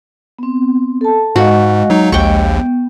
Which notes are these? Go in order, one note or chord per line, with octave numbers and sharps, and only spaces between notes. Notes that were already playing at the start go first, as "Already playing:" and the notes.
B3 C4
A4 A5
G#2 G#3 F#4 D#5 F5
F#3 D#4
A#1 D#2 G5 C#6
B3